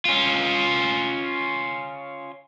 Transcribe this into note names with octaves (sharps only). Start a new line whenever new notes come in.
C#4 F4